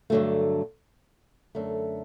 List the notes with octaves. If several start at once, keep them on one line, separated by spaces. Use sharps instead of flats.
G2 D3 F#3 A3
F#2 D3 A3